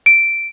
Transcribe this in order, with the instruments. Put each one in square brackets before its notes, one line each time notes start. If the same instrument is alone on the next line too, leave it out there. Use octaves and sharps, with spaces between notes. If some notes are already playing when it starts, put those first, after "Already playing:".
[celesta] D7